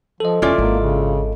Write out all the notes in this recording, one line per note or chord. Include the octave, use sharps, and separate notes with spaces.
F3 A4 D#5
E1 C#4 E4 F4 D5
G#1 A#3
C#3